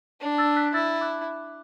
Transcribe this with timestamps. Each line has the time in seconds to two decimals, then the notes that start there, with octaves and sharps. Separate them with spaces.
0.21 D4
0.38 E6 A6
0.56 F#6 B6
0.74 E4 E6 A6
1.01 D6 F#6